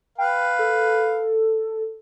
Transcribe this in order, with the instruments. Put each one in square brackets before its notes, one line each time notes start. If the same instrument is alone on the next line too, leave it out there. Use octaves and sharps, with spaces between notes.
[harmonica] B4 F5 [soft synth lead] G5
[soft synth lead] A4